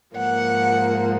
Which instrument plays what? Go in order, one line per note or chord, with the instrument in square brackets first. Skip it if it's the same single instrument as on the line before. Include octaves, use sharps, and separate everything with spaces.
[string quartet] G#2 F3 A#3 F#5